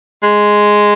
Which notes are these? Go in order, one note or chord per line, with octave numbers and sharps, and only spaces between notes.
G#3